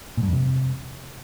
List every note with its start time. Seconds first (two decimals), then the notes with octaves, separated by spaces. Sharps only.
0.17 A#2
0.23 G2
0.28 F2
0.33 C3